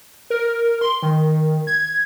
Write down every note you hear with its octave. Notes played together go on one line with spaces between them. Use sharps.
A#4
C6
D#3
G#6